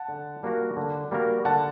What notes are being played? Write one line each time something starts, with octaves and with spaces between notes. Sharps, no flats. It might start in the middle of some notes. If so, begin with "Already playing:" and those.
Already playing: F#5 A5
D3
G3 A#3 F#4 A#4
D3
G3 A#3 F#4 A#4
D3 F#5 A5